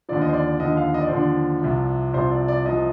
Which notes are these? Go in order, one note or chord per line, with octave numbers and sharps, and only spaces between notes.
D#2 D3 F3 D5
D#5
C5
D5
D5
D#2 D3 F3 D#5
F5
D#5
D5
C5
D#2 D3 F3 D5
C2 C3 F3
C2 C3 F3 C5
D5
D5
C2 C3 F3 D#5